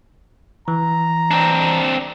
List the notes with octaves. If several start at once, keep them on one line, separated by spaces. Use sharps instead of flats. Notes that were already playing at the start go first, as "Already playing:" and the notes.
E3 A#5
C4 D4